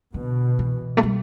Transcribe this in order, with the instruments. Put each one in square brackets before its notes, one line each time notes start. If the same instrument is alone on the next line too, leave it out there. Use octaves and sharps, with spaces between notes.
[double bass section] B2 [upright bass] D3
[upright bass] E3
A3
G3